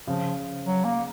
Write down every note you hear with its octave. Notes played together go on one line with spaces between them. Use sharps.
C#3 F3
F#3
A#3